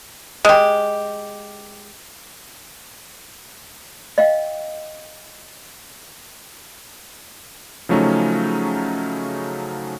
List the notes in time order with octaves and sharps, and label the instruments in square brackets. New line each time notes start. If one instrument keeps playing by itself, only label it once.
[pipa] G#3 G4
[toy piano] D#5 F5 G5
[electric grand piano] C#3 F3 F#3 A3 C#4 D#4